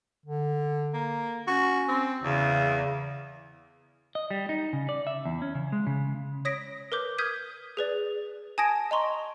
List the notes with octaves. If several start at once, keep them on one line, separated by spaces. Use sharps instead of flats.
D3
A#3
C#4 F#4
C4
E2 C#3
D#5
G3
D#4
C#3
D5
E5
E2
C#4
C#3
G#3
C#3
C#5 D#6 A#6 B6 D7
A#4 B4 D6 G6
D#6 F6 G6 G#6 B6 D#7
G#4 B4 D5
G#5 A5 D#6 G#6 A#6 D7
D#5 A#5 C6 C#6